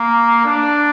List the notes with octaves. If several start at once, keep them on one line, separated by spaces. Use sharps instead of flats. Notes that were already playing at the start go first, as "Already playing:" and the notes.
Already playing: A#3
D4